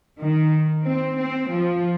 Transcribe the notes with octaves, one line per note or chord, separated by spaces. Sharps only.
D#3
C4
C4
F3